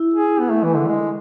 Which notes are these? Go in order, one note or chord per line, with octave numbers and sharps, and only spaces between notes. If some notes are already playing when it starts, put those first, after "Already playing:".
Already playing: E4
G#4
B3
A3
E3
D3
G#3